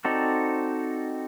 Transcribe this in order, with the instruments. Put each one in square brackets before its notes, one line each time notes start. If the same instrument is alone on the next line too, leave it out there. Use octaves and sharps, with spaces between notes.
[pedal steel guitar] C4 D#4 F#4 A4 D5